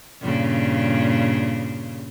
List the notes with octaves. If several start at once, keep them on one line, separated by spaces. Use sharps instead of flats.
G2 A#2 C#3